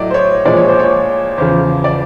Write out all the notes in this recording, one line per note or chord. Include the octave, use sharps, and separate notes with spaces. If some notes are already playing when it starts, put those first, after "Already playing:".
Already playing: A2 F#3 A3 D5 D#5
C5
C#5
A#2 F3 G#3 D5
C#5
C5
C#5
E2 C#3 F3 C5
D5